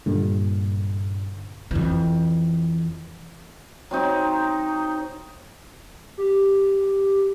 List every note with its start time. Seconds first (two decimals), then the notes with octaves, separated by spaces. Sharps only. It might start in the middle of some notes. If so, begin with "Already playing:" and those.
0.06 G2 A#2 D3
1.71 F2 E3
3.91 F#3 C4 D#4
6.18 G4